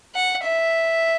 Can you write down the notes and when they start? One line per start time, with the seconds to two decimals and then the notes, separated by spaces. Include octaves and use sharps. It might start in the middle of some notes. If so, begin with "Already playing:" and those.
0.15 F#5
0.44 E5